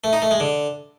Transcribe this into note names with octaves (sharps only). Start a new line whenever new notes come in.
A3
D#4
A3
G#3
D3